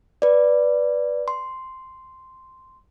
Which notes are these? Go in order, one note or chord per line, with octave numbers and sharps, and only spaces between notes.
B4 D5
C6